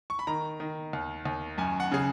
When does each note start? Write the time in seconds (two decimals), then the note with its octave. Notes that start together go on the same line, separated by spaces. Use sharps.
0.10 C#6
0.19 B5
0.27 D#3 A#5
0.60 D#3
0.93 D#2
1.26 D#2
1.58 F#2 G#5
1.80 F#5
1.91 C#3 G#4